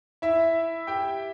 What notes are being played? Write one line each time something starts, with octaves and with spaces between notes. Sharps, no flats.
E4 E5
G4 G5